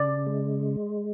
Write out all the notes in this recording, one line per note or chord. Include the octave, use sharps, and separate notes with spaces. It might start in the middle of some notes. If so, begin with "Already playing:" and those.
Already playing: C#3 D5
G#3